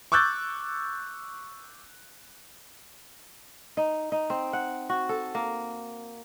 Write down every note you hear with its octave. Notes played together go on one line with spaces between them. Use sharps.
C#6 D6 E6 F#6 G6 A6
D#4
D#4
C4
F#5
F#4
A4
A#3